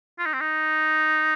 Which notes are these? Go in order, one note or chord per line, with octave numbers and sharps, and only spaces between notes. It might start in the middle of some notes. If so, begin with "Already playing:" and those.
F4
D#4
C4
D#4